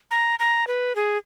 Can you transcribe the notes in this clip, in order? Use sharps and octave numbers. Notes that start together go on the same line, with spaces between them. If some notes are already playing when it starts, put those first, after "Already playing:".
A#5
A#5
B4
G#4